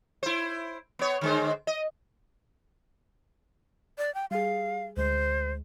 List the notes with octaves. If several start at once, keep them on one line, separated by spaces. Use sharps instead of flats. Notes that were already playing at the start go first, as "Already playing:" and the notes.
E4 C5
B3 C#5
D3 G#3 C5
D#5
D5
G5
G3 G#4 F5
D2 G#3 C5